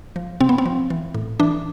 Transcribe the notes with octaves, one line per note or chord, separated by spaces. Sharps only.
F3
C3 C4
B3
C4
F3
E3
A2
E3 D4